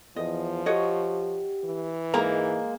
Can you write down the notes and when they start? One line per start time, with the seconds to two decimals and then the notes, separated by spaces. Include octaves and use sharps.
0.16 E2 F3 D#5
0.66 F#4 G4 C#5 D#5
1.64 E3
2.14 G#2 G#3 A#3 A#5